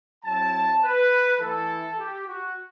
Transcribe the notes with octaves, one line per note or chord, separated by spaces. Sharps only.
F#3 C4 E4 A5
B4
E3 A3 E4 A4
G4
F#4